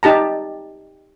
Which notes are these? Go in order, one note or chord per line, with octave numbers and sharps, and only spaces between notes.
D#4 G4 A5 A#5